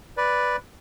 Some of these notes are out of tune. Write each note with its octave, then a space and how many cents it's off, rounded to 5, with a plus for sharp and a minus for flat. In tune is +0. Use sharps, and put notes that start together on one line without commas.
B4 +0 D5 +0